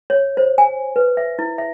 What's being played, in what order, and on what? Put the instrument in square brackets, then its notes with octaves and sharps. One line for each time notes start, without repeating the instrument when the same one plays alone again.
[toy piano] C#5
C5
G#5
B4
E5
E4
E5